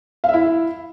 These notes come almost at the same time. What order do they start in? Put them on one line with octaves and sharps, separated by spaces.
F5 E5 E4